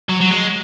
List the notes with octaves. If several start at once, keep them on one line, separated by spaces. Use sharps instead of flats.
F#3
F#3
G#3